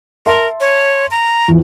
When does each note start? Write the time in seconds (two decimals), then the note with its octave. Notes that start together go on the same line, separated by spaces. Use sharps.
0.26 A#4 E5 A5 C6
0.60 C#5
1.11 A#5
1.48 E2 F3